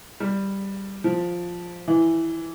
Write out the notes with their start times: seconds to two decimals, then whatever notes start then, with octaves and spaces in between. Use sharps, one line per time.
0.20 G3
1.04 F3
1.88 E3